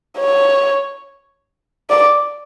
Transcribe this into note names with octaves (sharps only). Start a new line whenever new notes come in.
C#5
D5